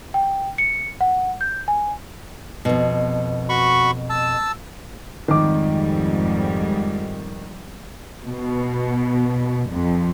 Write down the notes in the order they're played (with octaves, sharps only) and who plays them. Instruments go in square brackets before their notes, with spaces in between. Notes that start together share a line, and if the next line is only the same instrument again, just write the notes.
[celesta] G5
C#7
F#5
G6
G#5
[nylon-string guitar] F2 B2
[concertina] F#4 B5 C#6
A5 E6
[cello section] F2 G#2 G3 [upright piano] D#3 D6
[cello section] B2
F2